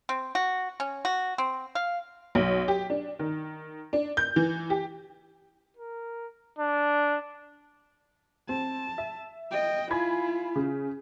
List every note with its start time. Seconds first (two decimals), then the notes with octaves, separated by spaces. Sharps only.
0.09 C4
0.35 F#4
0.80 C#4
1.05 F#4
1.38 C4
1.75 F5
2.35 B1
2.68 G4
2.90 D4
3.19 D#3
3.93 D4
4.17 G6
4.36 E3
4.70 G4
5.77 A#4
6.59 D4
8.49 C4 A5
8.98 E5
9.51 D#5 G5
9.90 E4 F4 G#5 B5 G#6
10.56 C#3